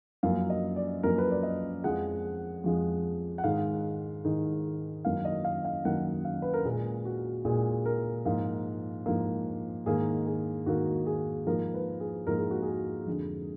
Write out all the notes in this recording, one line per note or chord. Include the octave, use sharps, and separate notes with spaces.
F#2 F3 A#3 F5
D#5
D5
F#2 F3 A#3 A#4
B4
D5
D#5
F2 F3 G#3 F#5
F2 F3 G#3
F#5
G#2 D#3 G#3 F5
G#2 D#3 G#3
F#2 D#3 A#3 F5
D#5
F5
F5
F#2 D#3 A#3 F#5
F5
B4
A#4
A#2 G#3 G#4
F#4
A#2 G#3 G#4
A#4
G#2 F3 A#3 F5
G#2 F3 A#3
G#2 D#3 A#3 G#4
G#4
G#2 D#3 A#3 F#4
G#4
G#2 F3 A#3 A#4
B4
G#4
G#2 F3 A#3 A#4
G#4
F#4
G#4
F2 D3 G#3